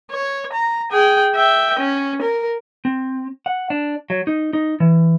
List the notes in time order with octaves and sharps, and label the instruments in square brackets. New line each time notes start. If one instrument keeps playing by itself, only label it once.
[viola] C#5
A#5
G#4 G5
E5 G5
C#4
A#4
[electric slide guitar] C4
F#5
D4
F#3
D#4
D#4
E3